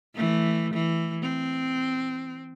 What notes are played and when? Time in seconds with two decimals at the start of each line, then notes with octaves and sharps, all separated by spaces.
0.15 E3 A3
0.74 E3
1.22 C4